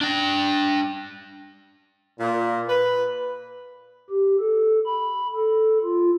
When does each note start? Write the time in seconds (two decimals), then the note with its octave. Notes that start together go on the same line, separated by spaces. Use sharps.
0.01 D4 G5
2.19 A#2
2.69 B4
4.10 G4
4.40 A4
4.86 B5
5.36 A4
5.84 F4